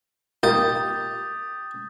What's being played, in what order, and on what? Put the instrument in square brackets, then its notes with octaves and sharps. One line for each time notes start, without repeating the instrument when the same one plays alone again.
[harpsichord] A#3 D#4 F4 [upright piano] G4 [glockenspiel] D#6 G6 A6